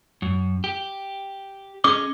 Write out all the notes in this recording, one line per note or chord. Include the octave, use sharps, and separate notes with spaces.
F#2
G4
C#4 G#4 D#5 D6